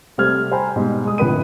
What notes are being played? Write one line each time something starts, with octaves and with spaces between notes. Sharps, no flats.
C3 G3 A3 C5 F6 G#6
C5 G5 G#5 A#5 B5
G#2 B2 G3
G#3 D#6
G1 F2 A2 B4 B5 D#7